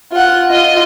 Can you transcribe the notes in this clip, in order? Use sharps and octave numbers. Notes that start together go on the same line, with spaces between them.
F4 F#5
F4 D#5